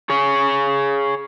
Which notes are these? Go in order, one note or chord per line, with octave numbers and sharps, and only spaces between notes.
G#4 C#5